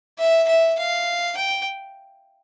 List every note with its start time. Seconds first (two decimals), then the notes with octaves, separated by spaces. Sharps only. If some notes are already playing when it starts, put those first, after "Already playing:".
0.19 E5
0.48 E5
0.78 F5
1.37 G5